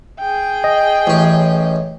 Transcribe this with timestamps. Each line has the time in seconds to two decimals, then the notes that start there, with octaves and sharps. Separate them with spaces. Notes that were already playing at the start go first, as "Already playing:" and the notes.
0.19 G#4 G5
0.64 D#5
1.07 A1 C#4